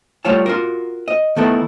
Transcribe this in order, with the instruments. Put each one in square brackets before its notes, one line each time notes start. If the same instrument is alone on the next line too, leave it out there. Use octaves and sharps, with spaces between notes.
[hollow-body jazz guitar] G3 A3 F4 C#5 A5
F4 F#4 A#4
D#5
D#3 A3 B3 E4 A4 A#4